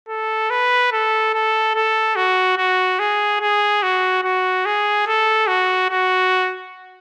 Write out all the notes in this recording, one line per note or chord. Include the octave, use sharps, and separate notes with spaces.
A4
B4
A4
A4
A4
F#4
F#4
G#4
G#4
F#4
F#4
G#4
A4
F#4
F#4